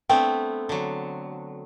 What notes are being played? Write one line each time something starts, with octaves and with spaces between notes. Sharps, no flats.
A3 B3 C4 D4 G5
D3 F#3